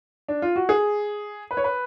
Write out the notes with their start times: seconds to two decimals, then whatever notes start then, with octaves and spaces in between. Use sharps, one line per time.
0.28 D4
0.42 F4
0.56 F#4
0.69 G#4
1.51 B4
1.57 C#5
1.64 B4